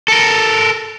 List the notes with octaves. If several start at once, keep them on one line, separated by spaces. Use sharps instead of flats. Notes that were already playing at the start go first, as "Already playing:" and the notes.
A4 A#4